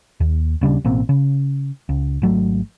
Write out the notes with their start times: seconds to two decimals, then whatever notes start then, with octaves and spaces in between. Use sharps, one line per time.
0.20 D#2
0.61 D#1 C#3 G3 D4
0.84 A1 B2 A#3 C4
1.09 C#3
1.89 C#2
2.22 G#1 F#3 A3